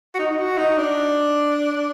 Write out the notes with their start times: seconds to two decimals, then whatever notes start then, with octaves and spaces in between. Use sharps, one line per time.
0.15 F#4
0.19 D#4
0.30 D#4
0.38 F#4
0.58 D#4
0.77 D4